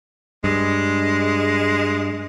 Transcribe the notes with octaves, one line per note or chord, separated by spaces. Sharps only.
G2 G#3